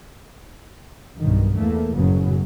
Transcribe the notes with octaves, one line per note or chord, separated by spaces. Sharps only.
B1 G2 D#3
E2 A3 A#3
F#1 F#2 A2 C#3 F#3 B3